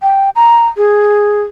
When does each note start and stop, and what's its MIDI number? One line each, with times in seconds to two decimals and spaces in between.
0.02 0.30 79
0.36 0.67 82
0.77 1.42 68